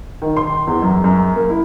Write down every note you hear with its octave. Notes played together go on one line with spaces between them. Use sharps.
D#3
C6
E2
F#2
F#2
A#3
E4